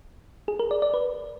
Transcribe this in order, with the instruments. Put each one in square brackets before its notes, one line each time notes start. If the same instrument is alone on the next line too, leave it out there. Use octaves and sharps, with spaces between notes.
[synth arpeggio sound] G#4
A#4
D5
D5
B4